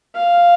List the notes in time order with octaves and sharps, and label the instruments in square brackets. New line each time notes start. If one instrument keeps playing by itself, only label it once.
[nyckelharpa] F5